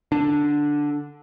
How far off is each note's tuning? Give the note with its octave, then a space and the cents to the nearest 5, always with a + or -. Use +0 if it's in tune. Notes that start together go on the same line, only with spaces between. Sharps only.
D3 +0 D4 +0